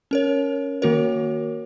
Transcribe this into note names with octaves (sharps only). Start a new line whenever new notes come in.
C#4 A#4 C#5
D#3 A#3 F#4 A#4 C#5